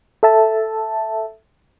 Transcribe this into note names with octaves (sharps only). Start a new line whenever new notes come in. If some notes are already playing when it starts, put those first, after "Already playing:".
A4 E5 A5